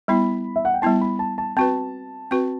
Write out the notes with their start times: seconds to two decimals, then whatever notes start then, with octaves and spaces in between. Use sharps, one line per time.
0.08 G3 B3 E4 B5
0.56 E5
0.65 F#5
0.74 G5
0.82 G3 B3 E4 A5
1.01 B5
1.19 A5
1.38 A5
1.57 C4 F#4 B4 A5
2.31 C4 F#4 B4